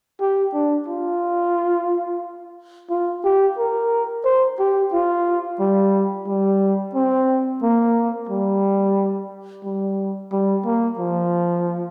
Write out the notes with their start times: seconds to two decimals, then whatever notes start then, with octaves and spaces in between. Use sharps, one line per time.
0.21 G4
0.54 D4
0.88 F4
2.90 F4
3.24 G4
3.58 A#4
4.25 C5
4.59 G4
4.93 F4
5.60 G3
6.27 G3
6.95 C4
7.62 A#3
8.29 G3
9.64 G3
10.32 G3
10.65 A#3
10.99 F3